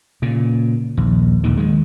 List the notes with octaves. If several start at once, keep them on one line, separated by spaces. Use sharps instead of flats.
A#2 C#3
A#1 D#2
A#1 D#2 D#3
D#3 G#3